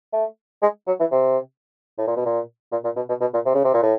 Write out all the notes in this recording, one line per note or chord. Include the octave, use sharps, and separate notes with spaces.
A3
G#3
F#3
E3
C3
A2
A#2
B2
A#2
A#2
A#2
B2
B2
B2
A#2
C3
C#3
C3
A#2
A2